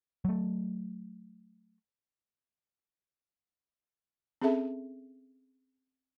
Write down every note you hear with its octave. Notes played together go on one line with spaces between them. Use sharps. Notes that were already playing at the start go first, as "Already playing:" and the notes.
F#3 A3
C4 C#4 G#4 A4 E5 A5